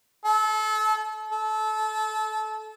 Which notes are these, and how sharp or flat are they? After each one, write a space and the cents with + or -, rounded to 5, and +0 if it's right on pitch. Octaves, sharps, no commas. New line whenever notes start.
A4 -30
A4 -25